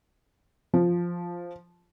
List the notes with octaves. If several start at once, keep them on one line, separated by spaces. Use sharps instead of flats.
F3